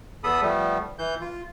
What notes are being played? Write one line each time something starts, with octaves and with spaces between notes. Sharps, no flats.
E2 B3 A4 B5 D#6
F3 G3 A3 B3
E3 G6
F4